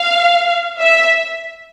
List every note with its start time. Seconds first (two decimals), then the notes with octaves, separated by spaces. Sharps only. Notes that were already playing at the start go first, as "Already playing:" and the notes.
Already playing: F5
0.80 E5